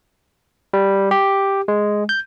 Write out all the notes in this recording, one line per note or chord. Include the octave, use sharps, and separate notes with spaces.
G3
G4
G#3
G6